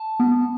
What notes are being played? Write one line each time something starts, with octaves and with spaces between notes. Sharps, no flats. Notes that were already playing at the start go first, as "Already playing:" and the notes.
Already playing: A5
B3